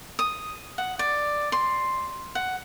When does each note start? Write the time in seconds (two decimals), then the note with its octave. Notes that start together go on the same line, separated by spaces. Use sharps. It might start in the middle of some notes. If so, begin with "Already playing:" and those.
0.19 D#6
0.78 F#5
0.99 D5
1.52 C6
2.35 F#5